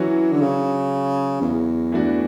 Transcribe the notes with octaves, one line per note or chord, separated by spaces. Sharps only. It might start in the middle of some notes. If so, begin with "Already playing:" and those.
Already playing: E3 F#3 C#4 F#4
D3
C#3
E2
E3 A3 D4 F#4